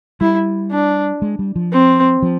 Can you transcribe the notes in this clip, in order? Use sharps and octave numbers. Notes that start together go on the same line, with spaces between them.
G3 E4
D4
G#3
G3
F3
C4
F3